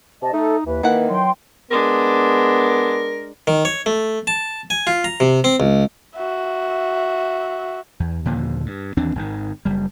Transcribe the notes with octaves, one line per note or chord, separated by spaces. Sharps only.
C3 D#5 A5
A3 D#4 A4
D#2 E3 B4
D#3 E3 A#3 E4 F#5
F#3 G5 C6
G#3 B3 D4 A#4
D#3
C#5
A3
A5
G#5
F4
A#5
C3
C4
C#2
F#4 E5
E2
D#2 A#2 D3 F3
G2
D#2 E3 C4 D4
G#1 G#2 D3 D#3
F#1 G3